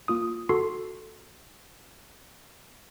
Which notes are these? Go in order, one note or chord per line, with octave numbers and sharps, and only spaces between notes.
A#3 F4 D#6
F#4 A4 C6 C7